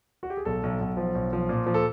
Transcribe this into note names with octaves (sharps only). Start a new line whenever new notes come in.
F#4
G4
G#4
B1 A4
B1
B1
F3
B1
F3
A#2
F3
A4